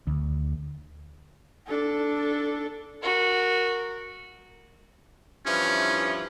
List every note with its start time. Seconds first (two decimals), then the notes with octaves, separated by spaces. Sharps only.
0.07 D2
1.67 D4 A4
3.02 F#4 A#4
5.46 G2 E3 F3 C#4